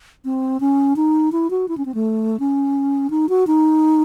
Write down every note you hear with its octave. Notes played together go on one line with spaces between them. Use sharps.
C4
C#4
D#4
E4
F#4
E4
C#4
C4
A3
C#4
D#4
F#4
D#4